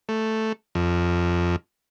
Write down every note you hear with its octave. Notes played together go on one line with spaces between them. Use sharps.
A3
F2